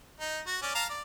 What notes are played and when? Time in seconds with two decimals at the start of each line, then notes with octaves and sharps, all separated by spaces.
0.20 D#4
0.47 F#4
0.62 C#4 D5
0.75 F5 A5 A#5
0.90 D5